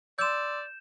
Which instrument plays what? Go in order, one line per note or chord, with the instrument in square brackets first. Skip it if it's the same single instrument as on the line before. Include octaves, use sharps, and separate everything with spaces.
[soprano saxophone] D5 [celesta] C6 D6 E6 [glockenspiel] G6 E7